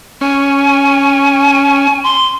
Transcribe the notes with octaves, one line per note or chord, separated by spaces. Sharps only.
C#4 G#5
C6